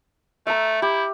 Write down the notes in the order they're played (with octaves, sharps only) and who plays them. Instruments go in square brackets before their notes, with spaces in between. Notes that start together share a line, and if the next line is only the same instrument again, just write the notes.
[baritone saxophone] A3 [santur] E5 A#5
[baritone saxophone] E4 [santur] G4